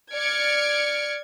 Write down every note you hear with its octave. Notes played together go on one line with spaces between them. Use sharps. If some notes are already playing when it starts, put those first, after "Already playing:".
D5 F6 G#6 C#7 D7